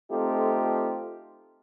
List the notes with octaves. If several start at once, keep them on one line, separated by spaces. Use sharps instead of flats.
A3 C4 D#4 F4 G4 A4